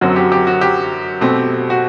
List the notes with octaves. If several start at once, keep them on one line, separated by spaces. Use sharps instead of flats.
F#2 D3 F#3 C4 F#4
G4
G4
F#4
G4
B2 A3 C4
F#4